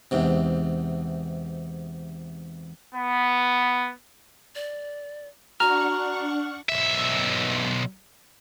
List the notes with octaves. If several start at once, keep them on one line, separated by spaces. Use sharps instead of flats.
E2 G#2 C3
B3
D5
D4 F#4 F#5 A#5 C#6 F6
B1 E5